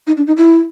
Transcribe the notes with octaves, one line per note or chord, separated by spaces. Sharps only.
D#4
D4
D#4
E4